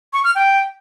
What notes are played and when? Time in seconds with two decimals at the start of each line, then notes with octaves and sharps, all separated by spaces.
0.13 C#6
0.24 F6
0.35 G5